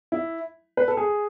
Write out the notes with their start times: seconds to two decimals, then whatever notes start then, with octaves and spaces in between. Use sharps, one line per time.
0.12 E4
0.77 B4
0.88 A4
0.97 G#4